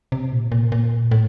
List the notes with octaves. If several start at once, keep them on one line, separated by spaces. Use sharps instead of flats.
C3
A#2
A#2
A#2
A2